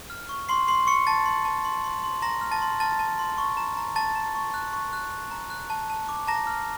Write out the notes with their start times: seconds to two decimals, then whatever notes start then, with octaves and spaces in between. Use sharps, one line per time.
0.10 F6
0.29 C#6
0.49 C6 C#6 C7
0.67 C6 C#6 C7
0.87 C#6 C#7
1.07 A5 A6
1.26 C6
1.45 A5
1.65 C6
1.84 C6
2.04 C6
2.22 A#5 C6 A#6
2.41 F6
2.51 A5 A6
2.62 C6
2.80 A5 F6 A6
2.99 A5
3.19 C6
3.38 C#6
3.57 A#5
3.77 A#5
3.96 A5 A#5 A6
4.16 A#5
4.35 C#6
4.54 F#6
4.73 C#6
4.93 F#6
5.11 F#6
5.31 A#5
5.50 F#6
5.70 A5
5.90 A5
6.09 D6
6.27 A5 A#5 A#6
6.47 F6